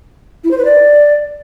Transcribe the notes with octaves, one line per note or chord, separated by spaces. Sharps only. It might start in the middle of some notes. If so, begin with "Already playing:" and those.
E4
C5
B4
D5